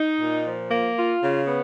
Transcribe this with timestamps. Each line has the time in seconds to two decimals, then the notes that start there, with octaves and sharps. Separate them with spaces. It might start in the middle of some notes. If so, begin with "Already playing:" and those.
Already playing: D#4
0.19 A#2
0.45 F3
0.70 A#3
0.97 F4
1.22 C#3
1.47 B3